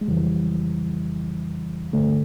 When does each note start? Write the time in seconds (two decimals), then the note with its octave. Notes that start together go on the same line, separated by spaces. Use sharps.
0.01 G#3
0.08 F2 C#3 E3 G3
1.93 G2 D3 A3